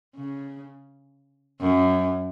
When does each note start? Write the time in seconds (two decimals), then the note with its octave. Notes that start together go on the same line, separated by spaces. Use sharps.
0.16 C#3
1.61 F#2